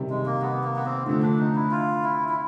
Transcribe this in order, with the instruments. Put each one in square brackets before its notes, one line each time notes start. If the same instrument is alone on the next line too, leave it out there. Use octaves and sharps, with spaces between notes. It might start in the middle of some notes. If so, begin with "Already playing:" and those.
Already playing: [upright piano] C3 D#3 G3
[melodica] G#3
A#3
B3
A#3
B3
C4
[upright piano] D3 F3 A3 [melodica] C4
[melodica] D4
D#4
E4
F4
E4
E4